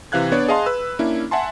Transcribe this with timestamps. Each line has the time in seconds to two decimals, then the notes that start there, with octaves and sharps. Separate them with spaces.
0.12 C3 E3 F5 F#6 G#6
0.32 B3 D4 C#5 D5
0.48 G#4 D#5 F5 A5 C6
0.66 B4 E6
0.99 A#3 C#4 D4 E4
1.31 E5 F#5 G#5 A5 C6